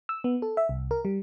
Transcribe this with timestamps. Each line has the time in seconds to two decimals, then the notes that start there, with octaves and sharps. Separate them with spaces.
0.09 E6
0.24 B3
0.42 A4
0.57 E5
0.69 C2
0.91 A#4
1.05 G3